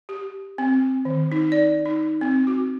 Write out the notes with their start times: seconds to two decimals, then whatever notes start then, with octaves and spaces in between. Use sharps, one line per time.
0.09 G4
0.58 C4
1.05 D#3
1.32 D#4
1.52 D5
1.85 D#4
2.21 C4
2.47 F#4